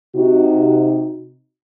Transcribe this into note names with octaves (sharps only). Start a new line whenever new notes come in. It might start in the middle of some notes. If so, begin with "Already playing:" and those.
C3 D#4 F#4